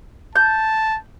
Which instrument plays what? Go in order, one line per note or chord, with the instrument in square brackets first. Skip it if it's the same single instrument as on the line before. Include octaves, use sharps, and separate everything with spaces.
[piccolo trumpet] A5 [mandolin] G6